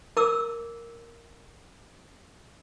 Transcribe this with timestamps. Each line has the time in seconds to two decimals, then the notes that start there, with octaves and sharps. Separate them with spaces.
0.17 A#4 D6 E6